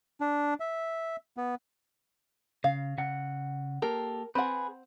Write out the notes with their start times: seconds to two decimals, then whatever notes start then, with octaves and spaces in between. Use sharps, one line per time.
0.21 D4
0.60 E5
1.37 B3
2.64 C#3 F5
2.98 C#3 F#5
3.82 A#3 G4 A4 A#4
4.35 C4 G#4 B4 F#5